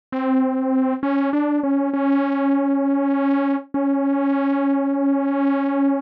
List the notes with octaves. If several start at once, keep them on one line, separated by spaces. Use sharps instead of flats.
C4
C#4
D4
C#4
C#4
C#4